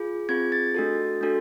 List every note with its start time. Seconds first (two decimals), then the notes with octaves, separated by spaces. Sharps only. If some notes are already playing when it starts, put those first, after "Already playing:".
Already playing: F4 G#4
0.29 C4 F4 G#4 G#6
0.52 A6
0.75 A3 D4 F#4 A4
1.21 A3 D4 F#4 A4